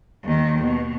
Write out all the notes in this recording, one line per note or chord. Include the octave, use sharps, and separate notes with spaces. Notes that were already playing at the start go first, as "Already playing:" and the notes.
D#2 D#3
B2